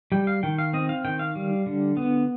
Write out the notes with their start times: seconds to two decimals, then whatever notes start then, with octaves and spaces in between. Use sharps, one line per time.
0.12 G3 G5
0.27 F5
0.43 D#3 G5
0.58 F5
0.73 C4 D#5
0.89 F5
1.05 D#3 G5
1.19 F5
1.35 G3
1.66 D3
1.97 B3